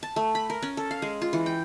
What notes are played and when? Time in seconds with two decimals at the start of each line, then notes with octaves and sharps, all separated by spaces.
0.03 A5
0.16 A3
0.35 B5
0.50 A#4
0.62 C#4
0.77 A4
0.91 F5
1.02 G#3
1.22 F4
1.33 E3
1.46 G5